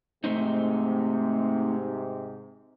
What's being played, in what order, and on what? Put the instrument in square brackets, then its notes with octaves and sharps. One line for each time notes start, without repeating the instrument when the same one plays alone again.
[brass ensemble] G#2 C3 [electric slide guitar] A3 C4 D#4